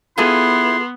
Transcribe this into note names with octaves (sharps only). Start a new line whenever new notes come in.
B3 E4 F4 G#4 A4 C6